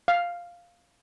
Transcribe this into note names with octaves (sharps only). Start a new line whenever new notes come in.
F5